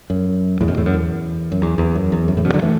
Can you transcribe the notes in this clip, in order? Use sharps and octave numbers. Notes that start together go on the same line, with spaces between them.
F#2
E2 A2
F#2 B2
E2 A2
F#2
E2
F#2
E2
E2
F#2
E2
F#2
E2 A2
F#2 B2
D3 F#3
E3 A3